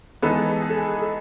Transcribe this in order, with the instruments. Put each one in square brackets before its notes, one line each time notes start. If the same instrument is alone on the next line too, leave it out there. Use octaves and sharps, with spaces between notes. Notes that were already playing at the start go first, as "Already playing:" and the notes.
[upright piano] E3 G#3 B3 D#4 [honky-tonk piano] A4
[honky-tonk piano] G#4
A4
G#4
A4